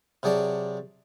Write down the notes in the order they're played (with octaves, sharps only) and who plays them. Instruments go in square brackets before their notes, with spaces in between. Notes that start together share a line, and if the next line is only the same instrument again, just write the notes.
[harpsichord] C3 F#3 G#4 D5 A5